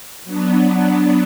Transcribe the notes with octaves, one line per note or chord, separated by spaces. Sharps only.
F#3 B3 D4